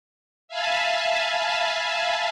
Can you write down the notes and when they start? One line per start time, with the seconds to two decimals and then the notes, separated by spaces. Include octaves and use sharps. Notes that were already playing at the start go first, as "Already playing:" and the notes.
0.48 E5 F5 G#5 A5 B5